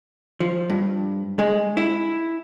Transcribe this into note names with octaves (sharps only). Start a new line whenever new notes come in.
F3
G2
G#3
E4